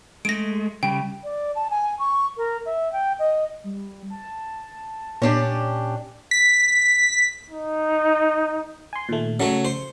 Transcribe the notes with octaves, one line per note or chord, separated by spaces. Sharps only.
G#3 A3 A#6 D7
C#3 G3 G5
D5
A5
G#5
C#6
A#4
E5
G5
D#5
G3
A5
A#2 C#4 D4 G4
B6
D#4
G#5 C6
A#2 D#3 A3
C#3 F#3 A3 C#7
C5